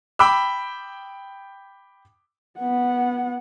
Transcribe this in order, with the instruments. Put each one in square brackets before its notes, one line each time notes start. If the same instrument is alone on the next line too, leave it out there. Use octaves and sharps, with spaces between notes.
[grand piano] G5 B5 D6 E6
[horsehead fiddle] B3 F#5